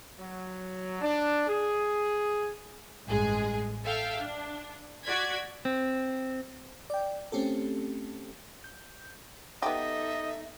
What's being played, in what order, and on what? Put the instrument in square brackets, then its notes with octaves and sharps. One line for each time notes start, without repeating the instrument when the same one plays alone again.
[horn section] F#3
D4
G#4
[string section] A1 G2 G#3 G#4
A4 E5 F5 G5
D4
F#4 D5 G#6 B6
[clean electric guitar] C4
[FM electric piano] D5 G5
A3 C4 C#4 G4 A4
G6
[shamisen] B3 G4 [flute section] D#4 A4 [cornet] D#5 [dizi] E5